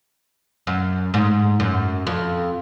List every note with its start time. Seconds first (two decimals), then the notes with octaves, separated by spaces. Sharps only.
0.67 F#2
1.14 G#2
1.60 F#2
2.07 F2